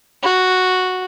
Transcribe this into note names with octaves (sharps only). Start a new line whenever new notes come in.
F#4